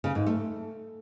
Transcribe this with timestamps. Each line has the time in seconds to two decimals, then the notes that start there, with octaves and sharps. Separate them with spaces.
0.04 C#3
0.15 G#2
0.26 A3